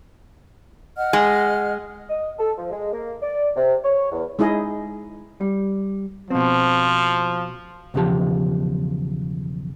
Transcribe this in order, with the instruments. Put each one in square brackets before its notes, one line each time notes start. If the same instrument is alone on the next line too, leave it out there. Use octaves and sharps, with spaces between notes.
[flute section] D#5 F#5 F6
[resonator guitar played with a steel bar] G#3
[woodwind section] D#5
A4
F3
G#3
A#3
D5
C3
C#5
E2
[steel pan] G#3 D#4 E4 G#4 D#5
[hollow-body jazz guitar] G3
[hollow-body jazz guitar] B2 C4 [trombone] F3
[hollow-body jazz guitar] B1 E2 C#3 F3 G4 A5